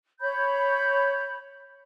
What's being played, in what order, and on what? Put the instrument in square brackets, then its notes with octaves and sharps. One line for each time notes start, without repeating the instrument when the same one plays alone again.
[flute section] C#5 B5 G6